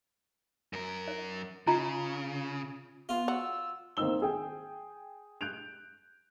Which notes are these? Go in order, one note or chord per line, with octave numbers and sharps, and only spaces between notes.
F#2 A#4
C#5
C#3 F4 A#5
B3 F4
F#4 E6
D#3 A#3 C4 D#4 E6 G7
G#4 G5
F#6 G6 D7 F7